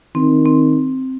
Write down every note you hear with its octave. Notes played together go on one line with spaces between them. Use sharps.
D#3 C4
C4